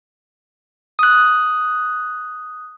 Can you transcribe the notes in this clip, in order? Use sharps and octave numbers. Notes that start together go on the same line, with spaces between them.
D#6 F#6